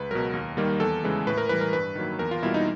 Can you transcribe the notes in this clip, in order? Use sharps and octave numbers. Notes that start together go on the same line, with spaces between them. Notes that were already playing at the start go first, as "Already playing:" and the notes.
Already playing: C#2 B4
B2 F#3 A#4
D#2
D#3 G3 A#3
E2 A4
C#3 E3 G#3
A2 B4
A#4
E3 G3 B4
A#4
G2 B4
D#3 F#3 A#3
E2 A#4
F4
B2 G3 A#3 E4
D#4